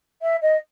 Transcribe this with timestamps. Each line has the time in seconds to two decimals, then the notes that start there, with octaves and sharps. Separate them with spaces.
0.22 E5
0.41 D#5